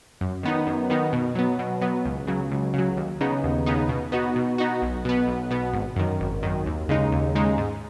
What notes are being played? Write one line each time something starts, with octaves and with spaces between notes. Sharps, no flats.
F#2
D#3 B3 D#4
F#2
D#3 B3 D#4
B2
F#3 B3
B2
F#3 B3
C#2
C#3 F#3
C#2
C#3 F#3
D#2
C#3 B3 D#4
D#2
C#3 B3 D#4
B2
B3 D#4 F#4
B2
B3 D#4 F#4
B1
B2 B3
B1
B2 B3
G#1
F#2 D#3
G#1
F#2 D#3
D#2
C#3 G#3 D#4
D#2
C#3 G#3 D#4
G#2